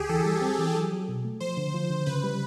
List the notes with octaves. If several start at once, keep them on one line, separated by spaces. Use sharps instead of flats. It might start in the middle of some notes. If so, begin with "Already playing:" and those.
Already playing: D2 G4 G#4
E3 A4
G3
C4
E3
F#3
F#3
B2
A3
F3 C5
D3
F3
D3
C#3 B4
G3